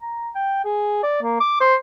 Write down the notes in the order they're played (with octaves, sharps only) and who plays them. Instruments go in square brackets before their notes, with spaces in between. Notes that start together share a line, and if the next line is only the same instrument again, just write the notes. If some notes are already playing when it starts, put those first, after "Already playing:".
[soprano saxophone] A#5
G5
G#4
D5
A#3
D6
C5